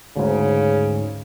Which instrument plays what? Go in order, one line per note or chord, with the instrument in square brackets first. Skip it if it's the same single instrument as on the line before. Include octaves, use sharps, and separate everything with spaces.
[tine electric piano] D2 G#2 [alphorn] C#3